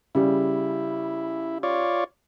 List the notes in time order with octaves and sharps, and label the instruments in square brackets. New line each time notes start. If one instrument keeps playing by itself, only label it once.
[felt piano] C#3 G3 [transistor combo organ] E4
[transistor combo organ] F4 C#5 D5